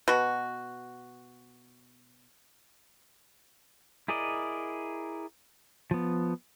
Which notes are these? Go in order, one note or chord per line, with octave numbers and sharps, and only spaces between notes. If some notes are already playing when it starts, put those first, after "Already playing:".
B2 F#4
E4 G#4 A#4 D5 D#5
F3 B3